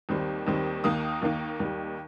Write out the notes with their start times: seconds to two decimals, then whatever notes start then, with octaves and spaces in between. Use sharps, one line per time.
0.09 D#2 D#3 G3 C4
0.47 D#2 D#3 G3 C4
0.84 D#2 D#3 A#3 D#4 D#6
1.22 D#2 D#3 A#3 D#4
1.59 D#2 D#3 G3